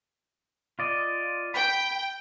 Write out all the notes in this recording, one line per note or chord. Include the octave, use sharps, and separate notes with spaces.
F4 D5 D#5
G5 B5